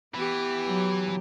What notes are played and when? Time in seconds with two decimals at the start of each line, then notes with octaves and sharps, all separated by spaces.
0.14 E3 B3 G4
0.67 F#3